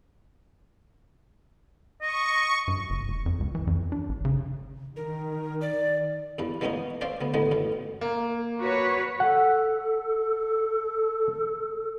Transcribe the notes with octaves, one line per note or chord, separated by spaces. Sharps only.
D#5 C#6
G2
F#1
F1
F2
C#2
E3
F2
D4
A1
C#3
D#3 A#4
D5
E2 G2 B4
E3 G#3 A#3 B3 C#4 D#4
C#4 C5 D5 E5 F5 C6
D2 B3
D2 A2 D3 D#3 G#3 B3
F#2 A2
A#3
F#4 B4 C#5
A4 F#5